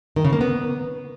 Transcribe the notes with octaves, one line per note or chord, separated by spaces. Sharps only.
D#3
C#3
A#3
B3